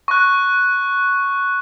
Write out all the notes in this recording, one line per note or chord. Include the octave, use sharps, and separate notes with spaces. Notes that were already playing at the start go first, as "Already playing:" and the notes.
C#6 F#6